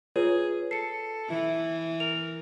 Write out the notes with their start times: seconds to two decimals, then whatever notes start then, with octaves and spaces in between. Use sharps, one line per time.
0.16 F4 G#4 B4 C#5
0.71 A4 C7 C#7
1.30 E3 E4
2.00 A#4 F7